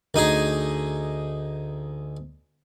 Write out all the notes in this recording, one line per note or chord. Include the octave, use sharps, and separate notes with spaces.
D2 D#4 G#4